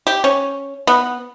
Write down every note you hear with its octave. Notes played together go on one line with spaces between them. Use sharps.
G4
C#4
B3